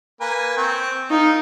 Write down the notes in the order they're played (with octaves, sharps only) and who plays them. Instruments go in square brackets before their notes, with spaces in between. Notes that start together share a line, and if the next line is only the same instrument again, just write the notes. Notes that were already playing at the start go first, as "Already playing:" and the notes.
[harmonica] A#3 B4 G#5
C4 G5 C#6
[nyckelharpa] D#4 [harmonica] F4 A#4